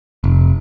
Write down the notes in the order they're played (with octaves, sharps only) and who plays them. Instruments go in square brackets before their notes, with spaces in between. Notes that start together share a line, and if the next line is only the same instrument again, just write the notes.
[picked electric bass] F1